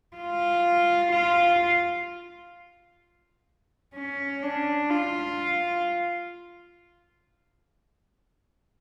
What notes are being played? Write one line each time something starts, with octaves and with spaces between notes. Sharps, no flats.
F4
F4
C#4
D4
F4